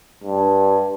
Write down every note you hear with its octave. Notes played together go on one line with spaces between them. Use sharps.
G2